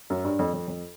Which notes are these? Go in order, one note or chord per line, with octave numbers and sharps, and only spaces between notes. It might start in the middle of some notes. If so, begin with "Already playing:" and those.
F#2
G2
F2
F2
F2